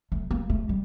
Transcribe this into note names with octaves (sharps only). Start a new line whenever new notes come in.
A3
A#3
A3
G3